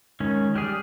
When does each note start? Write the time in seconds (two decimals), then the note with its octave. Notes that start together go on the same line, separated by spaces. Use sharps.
0.20 D#3 G#3 C#4
0.55 G3 G4 G#4 F6